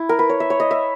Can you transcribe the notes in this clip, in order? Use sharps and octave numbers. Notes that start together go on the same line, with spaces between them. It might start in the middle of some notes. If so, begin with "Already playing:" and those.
Already playing: E4
A#4
B4
C#5
E5
C#5
D#5
E5